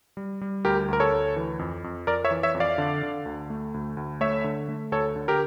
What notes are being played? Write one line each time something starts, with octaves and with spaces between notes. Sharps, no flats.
G3
G3
D2 G4 A#4
D2 A#4
A4 C#5
D2
E3
F2
F2
F2 A#4 D5
C#5 E5
E3
C#5 E5
F2
D5 F5
D3
D3
D2
A3
D2
D2
A3 C#5 E5
D3
A3
D2 A4 C#5
D3
G4 A#4